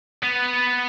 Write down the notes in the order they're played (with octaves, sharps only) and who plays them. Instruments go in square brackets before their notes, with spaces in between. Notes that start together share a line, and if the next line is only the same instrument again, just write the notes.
[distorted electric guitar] B3